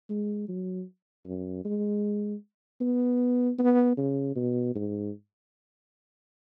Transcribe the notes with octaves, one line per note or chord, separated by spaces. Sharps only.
G#3
F#3
F#2
G#3
B3
B3
C#3
B2
G#2